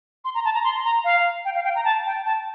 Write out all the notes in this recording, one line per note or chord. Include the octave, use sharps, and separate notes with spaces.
C6
A#5
A5
A#5
C6
A#5
F5
G5
F5
G5
A#5
A5
G5
A5